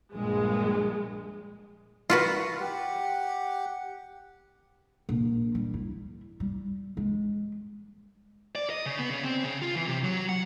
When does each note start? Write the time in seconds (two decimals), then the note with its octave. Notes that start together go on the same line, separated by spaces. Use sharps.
0.14 A#1 G2 G#3
2.10 F4 F#4 B4
2.60 G4 F#5
5.09 A#1
5.55 G3
5.74 E4
6.40 G3
6.97 G#3
8.55 D5
8.70 D#5
8.86 C#3
8.99 B3
9.10 C#3
9.24 C4
9.44 C#3
9.62 F4
9.76 E3
9.88 C3
10.03 F#3
10.29 F#5